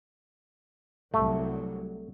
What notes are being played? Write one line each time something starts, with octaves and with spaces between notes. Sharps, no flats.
C2 F#3 A3